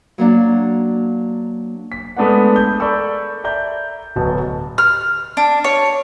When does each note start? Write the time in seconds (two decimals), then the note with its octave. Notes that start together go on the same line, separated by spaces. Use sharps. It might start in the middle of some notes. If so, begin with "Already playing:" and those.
0.18 F#3 A#3 D4
1.92 B6
2.16 G#3 A3 B3 D4 B4 F#5
2.56 G6
2.80 A4 A#4 D5 B5 C#6 E6
3.44 D5 E5 A#5 G6
4.16 D1 B2 F#3 B3 A5
4.78 F6
5.37 D4
5.64 C#5